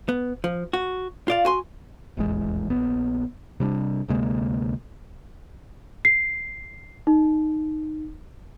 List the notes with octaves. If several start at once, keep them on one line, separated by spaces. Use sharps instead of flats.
B3
F3
F#4
F4 D5 F5
F#4 G#5 C6
D#1 A1 E2 G#3
A#1 F2 B3
C3 G3 C#4 D4
D2 C3 G#3 A#3
C7
D#4